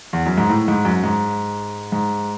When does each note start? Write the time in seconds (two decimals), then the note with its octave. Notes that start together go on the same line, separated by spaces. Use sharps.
0.13 E2
0.26 F#2
0.38 G#2
0.50 A2
0.68 G#2
0.85 F#2
1.04 G#2
1.92 G#2